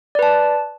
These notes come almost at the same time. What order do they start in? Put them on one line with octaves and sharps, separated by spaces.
D5 B4 A5